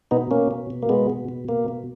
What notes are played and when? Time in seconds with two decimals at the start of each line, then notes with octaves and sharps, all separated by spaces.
0.11 B2 B3 D#4
0.31 B2 A#3 C#4
0.51 B2
0.70 B2
0.83 A#3
0.89 B2 G#3 B3
1.10 B2
1.29 B2
1.48 B2 A#3
1.68 B2